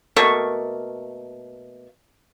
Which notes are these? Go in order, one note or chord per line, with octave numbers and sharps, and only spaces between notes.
B2 A3 A#3 C#6